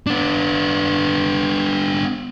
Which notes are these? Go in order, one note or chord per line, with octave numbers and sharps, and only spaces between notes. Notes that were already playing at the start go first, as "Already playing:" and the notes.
B3 D4